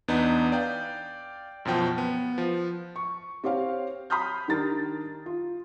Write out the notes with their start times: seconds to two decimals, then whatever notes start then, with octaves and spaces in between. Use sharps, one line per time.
0.08 E2 B3 D4 D#4
0.52 D5 F5 G5 G6
1.65 F#2 B2 F3 G5 A5
1.98 B3
2.38 F3
2.96 C#6
3.44 C4 G4 C#5 F5
4.10 B5 C6 D#6 F6 G6
4.48 D#3 G3 D4 A#4 A#5 A6
5.26 F4